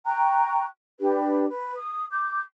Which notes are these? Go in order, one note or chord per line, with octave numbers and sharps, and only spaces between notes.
G5 A#5 C#6 F#6
D4 G4 B4
B4
D#6
D6 G6